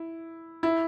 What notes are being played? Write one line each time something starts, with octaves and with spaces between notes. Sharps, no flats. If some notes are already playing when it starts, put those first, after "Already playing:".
Already playing: E4
E4